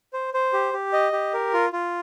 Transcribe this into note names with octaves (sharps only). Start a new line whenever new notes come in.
C5
C5
G4
G4
D#5
G4
A#4
F4
F4